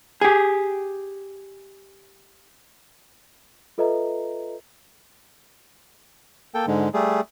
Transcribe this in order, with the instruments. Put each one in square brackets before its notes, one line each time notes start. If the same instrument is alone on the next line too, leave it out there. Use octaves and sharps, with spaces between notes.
[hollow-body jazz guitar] G4 G#4
[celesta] F4 A4 B4 D#5 E5 A#5
[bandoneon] A#3 A4 G5
G#2 D3 G#3
G3 A3 G#4